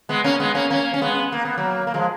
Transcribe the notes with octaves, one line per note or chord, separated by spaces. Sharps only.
G#3 B3
A#3 C#4
G#3 B3
A#3 C#4
A#3 C#4
C#4
G#3 B3
A#3
B3
F#3 A#3
A#3
F3 G#3